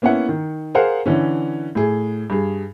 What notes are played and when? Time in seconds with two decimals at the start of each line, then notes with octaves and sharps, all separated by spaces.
0.02 A#3 B3 C#4 E4 F#5
0.29 D#3
0.75 G#4 A#4 C5 F5 F#5
1.06 D3 E3 C#4
1.75 A2 G#4
2.30 G2 G#4